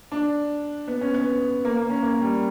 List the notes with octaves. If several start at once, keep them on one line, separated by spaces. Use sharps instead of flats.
D4
B3
C#4
B3
A#3
A#3
C#4
A#3
G3